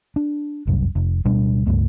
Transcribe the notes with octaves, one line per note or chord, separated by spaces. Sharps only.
D4
F1 C2 F#2
F1
D1 B2 G3 D4
C#2 G2 A3